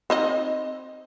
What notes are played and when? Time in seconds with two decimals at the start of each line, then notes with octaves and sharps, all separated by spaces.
0.10 C4 D#4 D#5